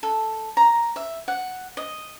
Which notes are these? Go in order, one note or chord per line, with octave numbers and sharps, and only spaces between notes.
A4
A#5
E5
F#5
D#5